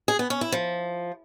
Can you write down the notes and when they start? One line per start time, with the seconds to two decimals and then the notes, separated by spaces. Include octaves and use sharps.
0.08 G#4
0.19 B3
0.30 C#4
0.41 E4
0.52 F3